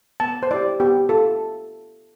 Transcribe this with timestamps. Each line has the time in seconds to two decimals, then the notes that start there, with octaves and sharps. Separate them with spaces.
0.20 B3 A5
0.43 C5
0.51 E4 G4 D5
0.80 B3 G4
1.09 F4 A4